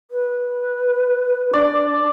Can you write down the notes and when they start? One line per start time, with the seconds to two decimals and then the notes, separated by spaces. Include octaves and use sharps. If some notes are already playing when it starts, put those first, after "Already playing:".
0.11 B4
1.53 D4 D5